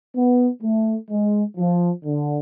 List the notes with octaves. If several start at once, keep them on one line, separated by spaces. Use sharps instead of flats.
B3
A3
G#3
F3
D3